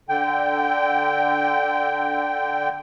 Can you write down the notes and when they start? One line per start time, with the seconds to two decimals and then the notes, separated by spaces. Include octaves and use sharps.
0.09 D3 G5